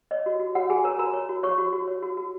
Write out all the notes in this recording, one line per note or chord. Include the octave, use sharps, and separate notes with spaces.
C#5 D#5
F#4
F#4
F#4 C#5 F#5
F#4 G#4 G#5
A#4 C#5 A#5
F#4 A#4 A#5
C#5
F#4
C#5 C#6
F#4
F#4
C#5
F#4
F#4